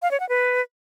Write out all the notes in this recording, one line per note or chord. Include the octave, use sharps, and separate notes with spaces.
F5
C#5
F#5
B4